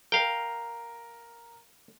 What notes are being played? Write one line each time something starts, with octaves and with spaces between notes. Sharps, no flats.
A#4 F5 G5